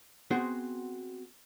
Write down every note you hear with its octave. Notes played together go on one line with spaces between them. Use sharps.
B3 C4 F#4 G#4 C5